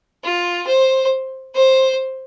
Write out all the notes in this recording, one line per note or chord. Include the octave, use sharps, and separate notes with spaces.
F4
C5
C5